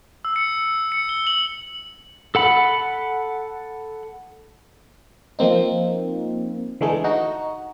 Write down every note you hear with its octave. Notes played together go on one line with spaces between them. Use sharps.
E6
C#7
C#7
G7
F#7
A4 F#5 B5
F3 A#3 C4 D#4
D3 E3 G#3 A3 D#4 G#4
D#4 F#4